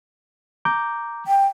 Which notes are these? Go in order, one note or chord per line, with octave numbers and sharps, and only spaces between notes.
A#5 D6 G6
G5